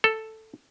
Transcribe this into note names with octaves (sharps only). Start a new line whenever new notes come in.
A4